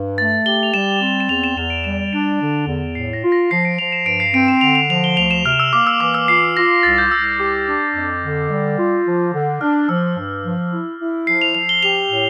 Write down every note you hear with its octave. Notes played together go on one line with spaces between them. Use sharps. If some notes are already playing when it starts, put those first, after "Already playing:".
Already playing: G2
A3 A6
G4 G7
F7
G3 E7
C4
E7
E2 F7
E7
E2 E7
D7
G3 E7
D4 D7
D3
E2
A2 C7
A#6
F4
A#6
F3 C7
D7
F3 F7
E7
G2 D7
C7
C4 D7
E7
D3 F7
F7
F3 F7
G7
D2 F7
E7
C3 F6
E6
A#3 D6
E6
E3 D6
E6
F4 C7
F4 A#6
C2 A6
G6
C2 E6
E6
G4 D6
D4
F2
D3
G3
F4
F3
D3
D4 F6
F3 E6
G2
F3
E4
E4
F3 C7
F7
F3 F7
G7
G4 F7
A2